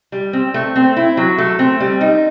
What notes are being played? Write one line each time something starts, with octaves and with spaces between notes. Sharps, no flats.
G3
C4
A3
C4
E4
F#3
A3
C4
G3
D#4